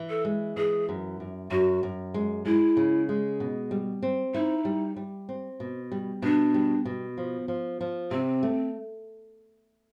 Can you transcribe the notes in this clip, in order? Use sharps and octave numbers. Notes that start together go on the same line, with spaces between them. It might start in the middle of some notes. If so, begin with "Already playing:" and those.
Already playing: E3
A4
G#3
E3 G#4
F#2
F#2
F#2 F#4
F#2
G#3
G#3 E4
C#3
G#3
B2
G3
C4
D#4 E4
G3
G3
C4
B2
G3
B2 D4
G3
B2
F3
F3
F3
C3 C4
A3